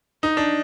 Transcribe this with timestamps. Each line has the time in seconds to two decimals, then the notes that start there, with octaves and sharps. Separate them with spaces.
0.23 D#4
0.37 D4